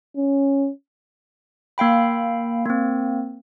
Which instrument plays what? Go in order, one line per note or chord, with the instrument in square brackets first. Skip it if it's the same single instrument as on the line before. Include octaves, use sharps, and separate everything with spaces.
[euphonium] C#4
[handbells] A#3 F5 G5 B5
A#3 C4